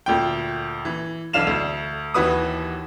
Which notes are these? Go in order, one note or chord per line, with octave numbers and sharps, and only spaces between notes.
D2 A#2 G5
E3
B1 E3 D4 F5 E7 F7
D2
D#2 E3 F#4 B4 D#6